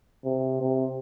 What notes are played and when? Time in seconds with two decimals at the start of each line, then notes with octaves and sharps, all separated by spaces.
0.24 C3
0.61 C3